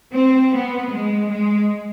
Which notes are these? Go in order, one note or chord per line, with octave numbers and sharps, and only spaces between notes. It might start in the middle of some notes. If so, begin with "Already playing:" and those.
C4
B3
G#3
G#3